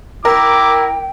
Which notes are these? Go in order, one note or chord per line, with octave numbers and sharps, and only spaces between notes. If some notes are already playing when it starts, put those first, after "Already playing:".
E4 A#4 G5 D6